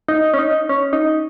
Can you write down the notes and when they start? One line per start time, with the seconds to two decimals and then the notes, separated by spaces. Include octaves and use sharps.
0.08 D#4
0.34 C#4
0.39 D#4
0.69 C#4
0.93 D#4